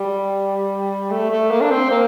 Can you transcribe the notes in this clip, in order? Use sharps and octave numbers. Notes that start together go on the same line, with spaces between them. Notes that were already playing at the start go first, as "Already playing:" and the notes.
Already playing: G3
A3
A3
A#3
D4
C4
A#3